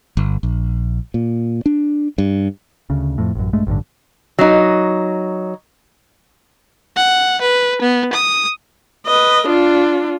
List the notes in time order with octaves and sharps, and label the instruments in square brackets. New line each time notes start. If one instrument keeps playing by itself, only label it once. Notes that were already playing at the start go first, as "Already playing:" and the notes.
[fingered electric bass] G1
A#1
A#2
D4
G2
[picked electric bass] D2 C#3
F2 A2
A1 F#2
A#1 G2 G#3 A3
A1 G2 D3
[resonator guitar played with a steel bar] F#3 D#4
[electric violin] F#5
B4
B3
D#6
[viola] B4 D#5
D4 F4